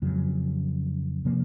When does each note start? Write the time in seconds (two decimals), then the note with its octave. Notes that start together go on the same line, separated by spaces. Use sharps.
0.02 F2 C#3 F#3
1.25 C3 F3 A#3